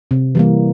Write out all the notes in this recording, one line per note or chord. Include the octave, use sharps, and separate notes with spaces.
C3
E3 G3 A#3